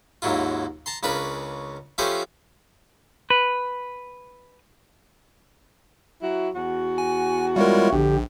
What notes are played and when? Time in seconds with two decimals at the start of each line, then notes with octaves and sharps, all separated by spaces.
0.22 D#2 G#2 F#3 E4 F4
0.86 A5 A#5 C6
1.03 C#2 C#3 D4 A#4 B4 B5
1.98 F3 A3 C#4 G4 B4 C5
3.30 B4
6.22 F#3 E4 F#4
6.54 E2 F#4
6.98 G#5
7.56 G3 G#3 E4 F4 A#4 C#5
7.93 A#1 D3 G4